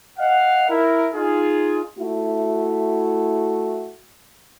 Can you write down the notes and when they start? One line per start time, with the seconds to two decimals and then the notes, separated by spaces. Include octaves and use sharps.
0.19 D#5 F5 F#5
0.69 E4 A#4
1.14 D#4 F4 G#4
1.98 A3 E4 F#4